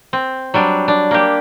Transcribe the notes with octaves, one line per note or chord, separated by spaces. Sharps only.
C4
F#3 G3 D4
D4
A#3 G4